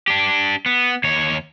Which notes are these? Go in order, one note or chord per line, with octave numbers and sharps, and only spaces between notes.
D4 G4
B3
D#2 C#5